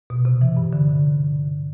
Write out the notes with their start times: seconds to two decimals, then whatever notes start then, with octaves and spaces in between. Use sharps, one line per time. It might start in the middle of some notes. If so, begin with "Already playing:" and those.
0.10 B2
0.25 C3
0.42 E3
0.57 G2
0.73 D3